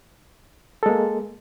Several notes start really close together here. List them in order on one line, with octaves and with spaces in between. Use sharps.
A4 G#3 A#3